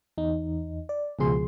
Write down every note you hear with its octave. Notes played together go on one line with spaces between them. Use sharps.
E2 D#4
D5
C#2 B2 F3 G#4 C6